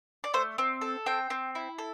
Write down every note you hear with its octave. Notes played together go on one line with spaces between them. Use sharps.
D5
A3 C5
C4
A4
C4 G5
C4
E4
A4